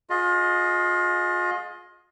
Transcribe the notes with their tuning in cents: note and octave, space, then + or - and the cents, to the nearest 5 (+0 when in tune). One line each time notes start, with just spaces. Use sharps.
F4 +35 G#4 +20 D#5 +0